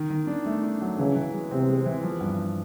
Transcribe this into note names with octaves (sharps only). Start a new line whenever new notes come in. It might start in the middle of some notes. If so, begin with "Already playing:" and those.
Already playing: D#3
D#3
D4
A3
D4
F#3
C#3 E3
E3
G#3
C3 C4
G#3
E3
F3
G2